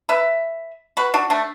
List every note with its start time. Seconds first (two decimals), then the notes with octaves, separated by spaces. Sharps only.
0.09 B4 E5
0.97 F#4 B4
1.14 D4 F#4
1.30 A3 D4